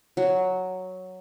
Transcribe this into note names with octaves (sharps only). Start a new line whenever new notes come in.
F#3